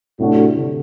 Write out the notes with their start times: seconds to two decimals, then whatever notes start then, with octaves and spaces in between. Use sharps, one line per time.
0.20 A2 C3 A3 D4 F#4
0.57 D3